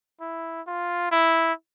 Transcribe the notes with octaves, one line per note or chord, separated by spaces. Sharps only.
E4
F4
E4